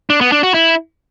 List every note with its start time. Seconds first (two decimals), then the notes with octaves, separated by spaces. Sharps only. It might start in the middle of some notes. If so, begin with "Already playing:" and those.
0.10 D4
0.21 B3
0.32 D4
0.43 F#4
0.54 E4